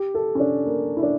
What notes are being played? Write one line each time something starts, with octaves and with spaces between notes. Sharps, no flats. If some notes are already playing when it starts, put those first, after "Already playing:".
Already playing: G4
A4
C#4
D4
A#3
E4
D4